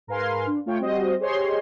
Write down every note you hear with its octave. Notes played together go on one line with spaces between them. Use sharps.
G#2 A#4 B4 F5 G#5 C6
D4
A3 F4 C#5 G5
G3 C4 F#4 C5 D#5
G4 G#4 C5 C#5 D#5 C6